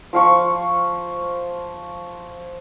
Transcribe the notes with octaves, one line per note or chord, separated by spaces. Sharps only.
F3 F5 C#6